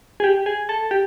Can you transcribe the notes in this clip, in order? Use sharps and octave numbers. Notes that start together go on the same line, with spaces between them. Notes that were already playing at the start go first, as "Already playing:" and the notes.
G#4
G4
G#4
A4
G4